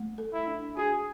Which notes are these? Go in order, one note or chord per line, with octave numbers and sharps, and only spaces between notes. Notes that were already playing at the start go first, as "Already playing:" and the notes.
Already playing: A3
A4
E4
D4
F#4 G#4